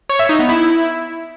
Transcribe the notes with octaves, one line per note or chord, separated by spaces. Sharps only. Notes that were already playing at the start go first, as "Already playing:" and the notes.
C#5
E5
D#4
B3
E4